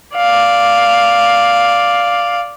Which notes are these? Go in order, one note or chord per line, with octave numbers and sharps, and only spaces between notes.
D5 F5